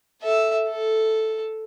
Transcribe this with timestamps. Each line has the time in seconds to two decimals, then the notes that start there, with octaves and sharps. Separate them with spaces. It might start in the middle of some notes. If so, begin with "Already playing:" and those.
0.22 A4 E5
0.69 A4